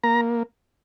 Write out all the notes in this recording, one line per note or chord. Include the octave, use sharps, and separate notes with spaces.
A#3 A#5